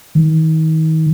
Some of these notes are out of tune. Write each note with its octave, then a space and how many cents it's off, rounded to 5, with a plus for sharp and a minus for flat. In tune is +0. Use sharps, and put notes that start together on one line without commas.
D#3 +35